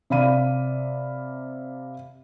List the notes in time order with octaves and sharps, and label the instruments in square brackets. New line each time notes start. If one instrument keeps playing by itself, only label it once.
[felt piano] C3 D5 F5 B5 D#7